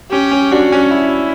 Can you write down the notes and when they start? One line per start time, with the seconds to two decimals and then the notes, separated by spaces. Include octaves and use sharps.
0.11 C#4 G4
0.31 C#4
0.51 D4 F#4
0.72 C#4
0.92 E4